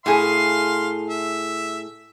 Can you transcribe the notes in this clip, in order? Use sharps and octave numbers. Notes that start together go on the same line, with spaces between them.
A2 G#4 F5 C6
E5